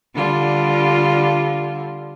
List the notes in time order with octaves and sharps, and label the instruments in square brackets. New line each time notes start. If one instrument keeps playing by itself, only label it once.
[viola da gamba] D3 G3 F4